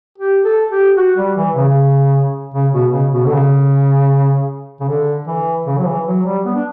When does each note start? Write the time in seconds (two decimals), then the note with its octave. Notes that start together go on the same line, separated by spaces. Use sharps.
0.18 G4
0.45 A4
0.72 G4
0.97 F#4
1.17 G3
1.37 E3
1.56 C#3
2.54 C#3
2.73 B2
2.93 C#3
3.12 B2
3.26 D3
3.33 C#3
4.81 C#3
4.89 D3
5.28 E3
5.67 C#3
5.78 F#3
5.86 E3
6.07 F#3
6.25 G3
6.45 B3
6.55 D4